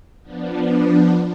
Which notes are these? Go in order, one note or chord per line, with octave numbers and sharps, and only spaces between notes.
F3 B3 D4